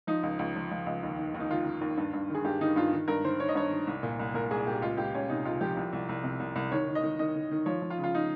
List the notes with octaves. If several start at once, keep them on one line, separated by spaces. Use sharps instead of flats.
F3 D#4
C#2
C#2
F3
F3
C#2
D#2
D#3
D#2
D#4
D#3 F4
D#3
D#2
G2
G2
D#3 G#4
G2 G4
D#3 D#4
G2 F4
D#3
G2 A#4
D#3 C5
D#3 C#5
D#5
G2 C#5
D#3
C2
A#2
C2
A#2 A#4
C2 G#4
A#2 G4
C#2 F4
C#2 G4
C#2 C#4
C3 D#4
C#2 F4
F3 G4
C2
C2
C2
C3
C2
C2
D#3 C#5
D#3
D#5
D#3
D#3 D#5
D#3
D#3
F3 C#5
F3
F4
C#3
F4
D#4